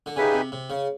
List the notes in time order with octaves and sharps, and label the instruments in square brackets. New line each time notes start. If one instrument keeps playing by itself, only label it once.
[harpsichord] D3
[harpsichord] C#3 [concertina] D#4 G4 B4 E5 G#5
[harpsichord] C3
C3
C#3